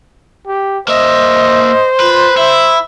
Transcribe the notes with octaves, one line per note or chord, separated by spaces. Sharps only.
G4
A#3 C5 D#5 E5
F4 B4
E4 E5